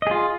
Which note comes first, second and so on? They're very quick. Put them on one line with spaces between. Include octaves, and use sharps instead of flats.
D#5 G#4 F4